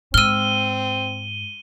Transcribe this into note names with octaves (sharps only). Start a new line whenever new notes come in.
G#2 C4 E6 F6 D#7 G7